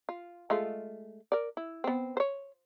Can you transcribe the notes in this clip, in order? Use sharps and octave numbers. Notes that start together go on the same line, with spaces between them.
F4
G#3 A3 F4
A#4 D5
E4
B3 C4
C5 C#5